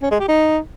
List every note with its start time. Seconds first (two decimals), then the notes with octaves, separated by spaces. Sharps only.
0.02 C#4
0.11 G#3
0.20 G4
0.28 D#4